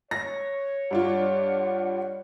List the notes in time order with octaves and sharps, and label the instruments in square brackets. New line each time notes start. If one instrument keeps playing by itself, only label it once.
[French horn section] C#5 [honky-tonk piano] A#6
[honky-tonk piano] G2 D4 F4 [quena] F#5